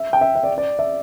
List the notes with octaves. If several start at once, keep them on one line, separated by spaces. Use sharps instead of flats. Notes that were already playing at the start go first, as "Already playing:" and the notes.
Already playing: E5
G5
E5
E5
D5
D5
E5